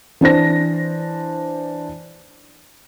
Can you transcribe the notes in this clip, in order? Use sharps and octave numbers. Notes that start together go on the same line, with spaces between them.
E3 D4 C5 A#6